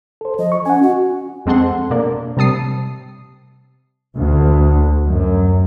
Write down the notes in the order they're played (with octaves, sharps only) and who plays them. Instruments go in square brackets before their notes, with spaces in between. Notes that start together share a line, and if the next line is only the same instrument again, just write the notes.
[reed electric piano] A4 C5
[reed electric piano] F3 [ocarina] D#5
[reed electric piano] C#6
[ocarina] C#4 [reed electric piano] F#5 G#5
[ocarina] F#4
[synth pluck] F2 G#3 C4 A4 F#5 C6
B2 A#3 D4
C3 G3 A5 D#6 C7
[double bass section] D2
F#2